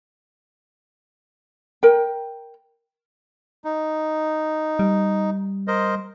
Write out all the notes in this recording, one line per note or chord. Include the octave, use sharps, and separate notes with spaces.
A#4 G5
D#4
G3
A#4 C5 D#5